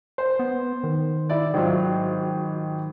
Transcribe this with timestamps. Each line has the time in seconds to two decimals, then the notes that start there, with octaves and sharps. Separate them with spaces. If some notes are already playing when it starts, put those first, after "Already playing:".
0.18 C5
0.39 B3
0.84 D#3
1.30 E4 D5
1.54 G#1 F#3 F4